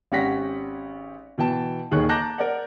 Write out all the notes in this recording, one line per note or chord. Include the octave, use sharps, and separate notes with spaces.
G#1 C#4 G4 F#5 A#6 B6
B2 E3 G5 A5
D#1 D#3 G#4 C#5 C#6 F#6
A5 A#5 D6 F#6 G6 A#6
A#4 D5 F#5